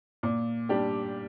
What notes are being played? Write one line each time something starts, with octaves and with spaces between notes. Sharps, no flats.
A#2
G3 D4 G4